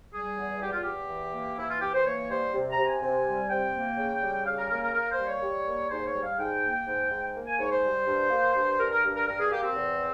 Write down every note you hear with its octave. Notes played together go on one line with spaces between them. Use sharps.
G3 G#4
E2
E2 G4
F4
E2 G4
E3
A#3
E3 E4
F4
E3 G4
C5
A#3 C#5
G3 C5
C3
A#5
C3
G#5
C3
G3
C3 G5
A#3
C#3
G3
C#3 F5
A#4
A#3 A#4
A#4
A#3 A#4
C5
G3
C#5
G3
A#3
G#2 C5
C#5
G3
F5
G#2 G5
A#3
G#2
G#2
A#3
G#5
G#2 C#5
C5
G3
G2
A#3
G2
G2 A#4
A#4
G2
A#4
G2 A#4
G#4
A#3 G4
C4
E2